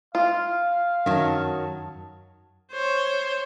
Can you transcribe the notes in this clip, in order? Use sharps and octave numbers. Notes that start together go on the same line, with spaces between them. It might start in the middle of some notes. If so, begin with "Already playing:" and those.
F4 F5
F#2 D#3 F#3 A5
C5 C#5